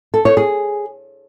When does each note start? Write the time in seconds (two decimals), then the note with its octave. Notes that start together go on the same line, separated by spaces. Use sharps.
0.14 A4
0.25 C#5
0.37 G#4